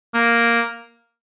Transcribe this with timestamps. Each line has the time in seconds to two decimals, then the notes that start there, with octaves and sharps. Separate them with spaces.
0.14 A#3